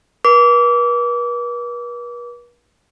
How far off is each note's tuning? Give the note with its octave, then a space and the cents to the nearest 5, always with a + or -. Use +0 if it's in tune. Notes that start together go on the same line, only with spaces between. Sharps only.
B4 -45 D6 -30